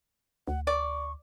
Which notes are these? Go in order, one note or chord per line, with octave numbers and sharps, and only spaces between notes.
D2 F#5
D5 C#6